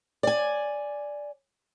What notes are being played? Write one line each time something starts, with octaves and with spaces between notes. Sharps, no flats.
D5 G#5